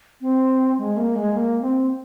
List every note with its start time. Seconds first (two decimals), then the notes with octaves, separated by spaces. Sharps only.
0.21 C4
0.78 G#3
0.97 A#3
1.15 G#3
1.34 A#3
1.62 C4